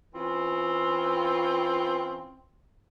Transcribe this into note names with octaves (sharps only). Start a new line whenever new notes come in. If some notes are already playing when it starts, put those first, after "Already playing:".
E3 C4 C#4 F4